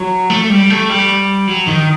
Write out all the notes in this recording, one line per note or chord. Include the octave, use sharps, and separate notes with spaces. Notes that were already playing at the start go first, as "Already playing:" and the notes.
Already playing: F#3
A3
G3
A3
G3
F#3
D#3